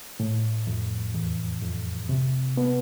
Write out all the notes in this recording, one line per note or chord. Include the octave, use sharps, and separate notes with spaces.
A2
F2
E2
F2
C3
B3